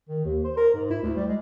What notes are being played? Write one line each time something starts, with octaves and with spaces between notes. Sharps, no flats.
D#3
D#2
C5
A#4
G#2
E4
D2
G3
G#3